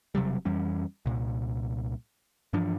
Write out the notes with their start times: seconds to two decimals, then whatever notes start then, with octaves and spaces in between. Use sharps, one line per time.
0.15 E1 C3 F#3 G3
0.45 F2 E3 G3 C#4
1.06 C2 A#2
2.53 G2 E3 F3 D4